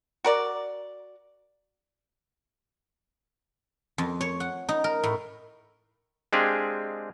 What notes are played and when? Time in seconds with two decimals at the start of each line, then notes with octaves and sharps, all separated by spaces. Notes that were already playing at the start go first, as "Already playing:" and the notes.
0.25 F#4 A#4 D5
3.98 F2
4.21 C#5
4.40 F#5
4.69 D#4
4.84 A#4
5.04 A2
6.33 G#3 C4 D4 G4 G#4 F5